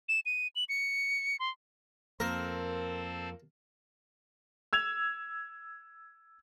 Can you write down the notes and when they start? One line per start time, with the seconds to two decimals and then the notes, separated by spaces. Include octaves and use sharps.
0.09 E7
0.26 D#7
0.56 F#7
0.69 C#7
1.40 C6
2.20 F2 A#3 C4 A4 A#4 C5
4.73 E6 G#6 F7